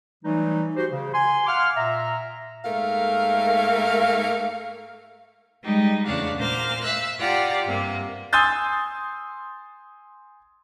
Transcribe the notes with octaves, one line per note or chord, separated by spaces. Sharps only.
E3 F#3 G3 A3 D#4
F#4 G4 C5
C#3
G#5 C6
F5 F#5 C6 D6 F6
A#2 E5 A#5
G#2 A3 A#3 A#4 F5
G3 G#3 D#4
E2 C#3 A3 D4 F5 F#5
A#2 A#3 C5 D6 F6
E5 F5 E6 F#6
F4 G4 D5 F#5 A#5
G2 C3 A#3
G#5 C6 D#6 E6 G6 A6